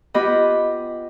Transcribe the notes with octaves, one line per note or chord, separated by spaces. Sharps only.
B3 F4 G4 D#5 B5